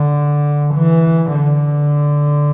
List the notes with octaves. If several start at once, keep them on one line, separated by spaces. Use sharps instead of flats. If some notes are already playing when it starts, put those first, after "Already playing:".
Already playing: D3
E3
D3